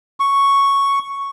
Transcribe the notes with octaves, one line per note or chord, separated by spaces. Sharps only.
C#6